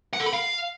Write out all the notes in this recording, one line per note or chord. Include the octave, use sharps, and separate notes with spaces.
F#5
A4
B5
F5